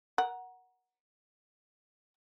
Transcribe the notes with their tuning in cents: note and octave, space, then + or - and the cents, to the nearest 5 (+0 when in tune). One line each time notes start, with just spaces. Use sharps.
A#4 +20 F#5 +0